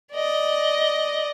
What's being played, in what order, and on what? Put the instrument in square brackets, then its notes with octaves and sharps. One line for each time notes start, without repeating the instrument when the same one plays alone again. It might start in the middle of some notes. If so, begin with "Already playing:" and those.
[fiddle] D5 D#5